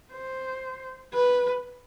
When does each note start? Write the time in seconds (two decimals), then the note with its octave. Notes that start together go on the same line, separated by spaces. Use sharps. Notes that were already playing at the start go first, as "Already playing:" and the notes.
0.13 C5
1.13 B4